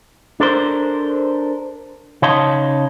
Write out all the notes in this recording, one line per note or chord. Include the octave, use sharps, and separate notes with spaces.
D4 A4 A#4 C5
C#3 D#4 C#5 D#5 A5 C6